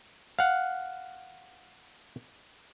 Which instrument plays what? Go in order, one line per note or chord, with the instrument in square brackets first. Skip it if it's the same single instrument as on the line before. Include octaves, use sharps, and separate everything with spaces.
[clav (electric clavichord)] F5 F#5